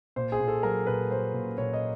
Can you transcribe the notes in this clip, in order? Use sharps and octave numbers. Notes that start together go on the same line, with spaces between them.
A#2 C5
G#4
A#2
A4
F#3 A#4
A#2 B4
F#3 C5
A#2
A#2 C#5
D#5